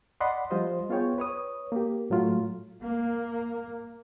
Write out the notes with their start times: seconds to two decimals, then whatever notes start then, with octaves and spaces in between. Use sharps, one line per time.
0.21 D5 D#5 F#5 B5 C6
0.51 F3 G3 F4 C5 D#5
0.89 B3 F4 G#4 C#5 G5
1.18 B4 C#5 D#6
1.72 A#3 G4
2.10 A2 F#3 A3 F4
2.82 A#3